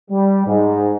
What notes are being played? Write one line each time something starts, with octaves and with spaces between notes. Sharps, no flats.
G3
G#2